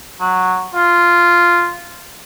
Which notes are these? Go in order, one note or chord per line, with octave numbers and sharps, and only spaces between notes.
F#3
F4